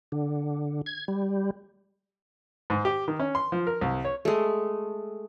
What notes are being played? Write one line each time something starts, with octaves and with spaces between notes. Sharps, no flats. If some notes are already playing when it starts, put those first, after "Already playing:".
D3
G#6
G3
G#2
G4
D#3
C#4
C6
F3
A#4
C2
C#5
G#3 A3